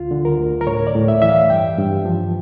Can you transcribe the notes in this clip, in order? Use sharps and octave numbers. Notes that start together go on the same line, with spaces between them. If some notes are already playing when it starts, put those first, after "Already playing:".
Already playing: D2 F4
D3
A#4
D2
A#4
A2 C#5
D5
A2
E5
E3 E5
F5
G2 G5
G2
F3